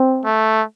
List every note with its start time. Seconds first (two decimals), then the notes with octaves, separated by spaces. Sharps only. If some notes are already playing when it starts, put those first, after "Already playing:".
Already playing: C4
0.25 A3